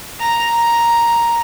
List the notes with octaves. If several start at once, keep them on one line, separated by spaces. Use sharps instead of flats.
A#5